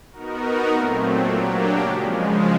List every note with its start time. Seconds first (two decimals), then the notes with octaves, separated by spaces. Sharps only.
0.12 B3 D#4 F#4 A#4
0.68 A#2 F#3 A3 C4
1.24 F#3 A#3 D4 G4
1.80 C#3 F3 G#3